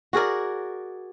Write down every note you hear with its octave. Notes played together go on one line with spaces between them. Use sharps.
F#4 G#4 A#4 D5